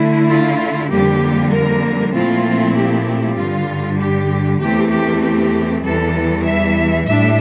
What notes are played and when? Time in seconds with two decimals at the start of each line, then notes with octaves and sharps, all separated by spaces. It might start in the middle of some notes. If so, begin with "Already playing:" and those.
Already playing: D3 A3 E4
0.28 F4
0.90 F2 D3 G3 A#3 G4
1.53 A#4
2.13 A#2 F3 A3 C4 E4 F4
2.76 G4
3.37 G2 D3 G3 F4
3.99 G4
4.60 E2 E3 A3 C4 G4
4.92 G4
5.22 G4
5.84 E2 E3 G3 A4
6.45 E5
7.07 A2 G3 D4 E5